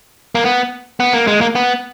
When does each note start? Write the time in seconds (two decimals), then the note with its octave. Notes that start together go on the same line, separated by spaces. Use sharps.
0.35 A#3
0.44 B3
1.00 B3
1.13 A#3
1.27 G#3
1.41 A#3
1.55 B3